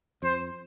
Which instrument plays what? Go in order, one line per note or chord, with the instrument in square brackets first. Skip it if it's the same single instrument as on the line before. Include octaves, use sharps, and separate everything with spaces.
[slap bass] F2 [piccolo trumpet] C5